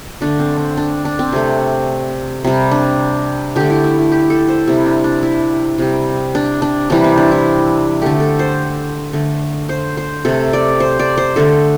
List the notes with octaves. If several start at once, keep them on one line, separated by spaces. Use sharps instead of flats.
D3 A3 D4
C4
D4
D4
D4
C4
C3 A3
C3 G3
D4
D3 A3 G4
E4
E4
E4
G4
A4
C5
C3 G3 E4
D4
D4
E4
C3 G3
D4
D4
C3 E3 G3 D4
C4
D4
E4
D3 A3 G4
A4
C5
D3 A3
C5
C5
C3 A3 A4
D5
C5
D5
C5
D3 A3 A4